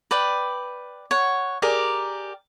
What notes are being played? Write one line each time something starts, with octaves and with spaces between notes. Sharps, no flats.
B4 D5 G5
C#5 F#5
G4 G#4 A#4 D5